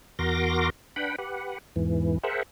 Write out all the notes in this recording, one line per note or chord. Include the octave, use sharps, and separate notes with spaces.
E2 F#4 A#4 C6 D6 A#6
D4 B4 F#5 G5 B5
G4 B4 F#5
E2 G#2 E3
G#4 A#4 C5 E5 F#5